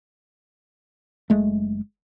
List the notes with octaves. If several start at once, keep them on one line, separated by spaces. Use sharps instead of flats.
F#1 G#3 A3